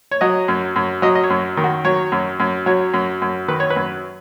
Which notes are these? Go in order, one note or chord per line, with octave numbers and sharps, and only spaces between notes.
C#5
F#3 D#5
F#2
F#2
F#3 D#5
D#5
C#5
F#2
D#3
F#4
F#3 C#5
F#2
F#2
F#3 C#5
F#2
F#2
D#3 B4
C#5
B4
F#2